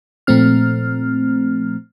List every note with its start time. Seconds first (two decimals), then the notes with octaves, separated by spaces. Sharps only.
0.27 A#2 F3 A3 C4 F6